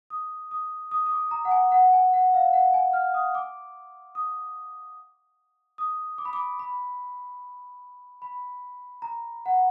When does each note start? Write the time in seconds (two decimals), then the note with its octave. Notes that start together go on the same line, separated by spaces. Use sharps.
0.10 D#6
0.51 D#6
0.91 D#6
1.06 D#6
1.12 D6
1.31 A#5
1.45 F#5
1.51 G#5
1.72 F#5
1.93 G#5
2.13 F#5
2.34 F5
2.53 F#5
2.74 G#5
2.93 F6
3.14 D#6
3.35 D6
4.15 D#6
5.78 D#6
6.18 D6
6.25 B5
6.33 D6
6.59 B5
8.22 B5
9.02 A#5
9.46 F#5